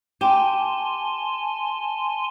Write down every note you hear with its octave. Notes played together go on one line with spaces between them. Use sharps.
G4 G#5 A5 C6